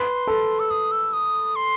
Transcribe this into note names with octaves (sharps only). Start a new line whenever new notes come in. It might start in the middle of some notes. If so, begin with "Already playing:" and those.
Already playing: B4 C6
A4
E6
D#6
E6
D#6
C6